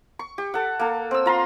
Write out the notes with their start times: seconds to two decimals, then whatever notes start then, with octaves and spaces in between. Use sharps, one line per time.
0.19 C#6
0.38 G4
0.54 A4 F#5
0.79 A#3 A4
1.11 C4 E6
1.26 F4 A#5 C6